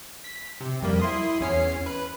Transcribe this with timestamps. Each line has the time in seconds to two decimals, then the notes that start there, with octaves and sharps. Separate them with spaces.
0.24 B6
0.61 C3
0.82 F2 G3 A#3
0.99 E4 C6 D#6
1.41 E2 C#4 C7
1.86 B4